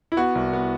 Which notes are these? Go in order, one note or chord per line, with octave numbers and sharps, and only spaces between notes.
E4
B3 F#4
C2
B3